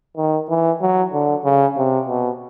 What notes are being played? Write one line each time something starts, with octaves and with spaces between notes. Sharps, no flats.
D#3
E3
F#3
D3
C#3
C3
B2